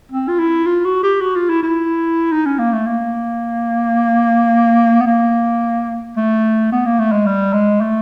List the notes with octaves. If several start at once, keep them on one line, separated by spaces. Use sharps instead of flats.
C4
F4
E4
F4
F#4
G4
F#4
F4
E4
E4
D#4
C#4
A#3
A3
A#3
B3
A#3
A3
B3
A#3
A3
G#3
G3
G#3
A3